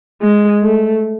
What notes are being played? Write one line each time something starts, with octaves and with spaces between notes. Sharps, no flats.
G#3
A3